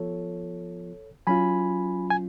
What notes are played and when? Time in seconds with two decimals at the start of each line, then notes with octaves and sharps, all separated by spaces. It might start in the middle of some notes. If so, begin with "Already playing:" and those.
Already playing: F3 B3 F4 A4 C#5
1.27 F#3 C#4 F4 G#5 B5
2.10 G#5